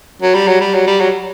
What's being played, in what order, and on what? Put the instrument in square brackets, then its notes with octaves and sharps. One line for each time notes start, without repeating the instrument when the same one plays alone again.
[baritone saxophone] F#3
G3
F#3
G3
F#3
G3
F#3